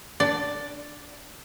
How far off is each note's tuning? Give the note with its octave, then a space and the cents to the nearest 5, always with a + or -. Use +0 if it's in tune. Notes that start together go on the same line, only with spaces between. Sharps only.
D4 +0 D5 +0 F#5 +40